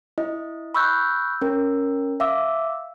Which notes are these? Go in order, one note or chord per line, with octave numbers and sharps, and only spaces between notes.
E4 D#5
B5 C#6 E6 F#6 G6
C#4 A#4
E5 F5 D6 E6